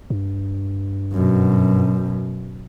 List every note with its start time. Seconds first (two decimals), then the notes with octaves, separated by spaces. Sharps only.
0.10 G2
1.13 F#2 B2